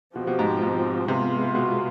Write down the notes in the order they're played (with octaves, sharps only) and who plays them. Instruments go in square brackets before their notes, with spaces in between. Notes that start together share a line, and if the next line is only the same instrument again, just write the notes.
[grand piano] B2 [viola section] F3 C4 G4
[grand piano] B2
G#2
G#2
[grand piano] C3 [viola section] G#3 B3 F4
[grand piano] B2